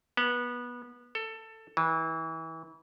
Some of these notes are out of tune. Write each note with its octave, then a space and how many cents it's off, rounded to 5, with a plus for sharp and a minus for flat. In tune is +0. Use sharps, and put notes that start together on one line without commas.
B3 -20
A4 +15
E3 -30